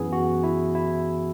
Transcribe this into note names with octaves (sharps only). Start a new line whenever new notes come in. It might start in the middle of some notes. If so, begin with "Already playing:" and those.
Already playing: F#2 E3 B3 G#4
F#4
E4
E4